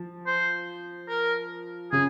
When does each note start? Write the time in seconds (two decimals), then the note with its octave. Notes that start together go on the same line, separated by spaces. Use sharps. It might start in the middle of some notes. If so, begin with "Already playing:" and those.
Already playing: F3
0.27 C5
1.09 A#4
1.92 C#3 G#4